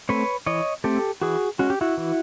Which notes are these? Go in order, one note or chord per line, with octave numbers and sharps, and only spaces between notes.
A3 C4 B4 C#5
E3 C#5 D#5
A3 C4 G4 A4
E3 F#4 G#4
G#3 C#4 F#4
G4
E4 F#4
E3